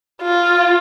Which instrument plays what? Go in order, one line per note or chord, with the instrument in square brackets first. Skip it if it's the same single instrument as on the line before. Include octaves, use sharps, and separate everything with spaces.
[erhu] F4